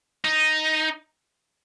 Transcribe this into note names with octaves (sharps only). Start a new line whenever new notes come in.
D#4